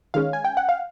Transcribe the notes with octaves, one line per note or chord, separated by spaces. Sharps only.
D#3 G#3 C#4 F5
G#5
G5
F#5
F5